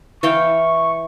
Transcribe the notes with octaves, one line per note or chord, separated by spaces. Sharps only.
E3 F5 G5 C#6